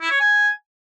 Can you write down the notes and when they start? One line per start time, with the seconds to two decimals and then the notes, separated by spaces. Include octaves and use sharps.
0.02 E4
0.11 C#5
0.20 G#5